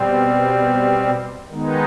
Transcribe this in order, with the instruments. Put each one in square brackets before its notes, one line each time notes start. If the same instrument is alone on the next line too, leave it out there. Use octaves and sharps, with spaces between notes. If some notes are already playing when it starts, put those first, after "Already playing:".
Already playing: [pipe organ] B2 G3 C4
D#3 G#3 B3 D#4